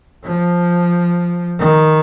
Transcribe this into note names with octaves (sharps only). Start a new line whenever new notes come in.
F3
D#3